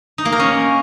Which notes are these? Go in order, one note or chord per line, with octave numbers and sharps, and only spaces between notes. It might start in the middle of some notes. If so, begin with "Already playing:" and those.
D#4
A#3
A#4
C#4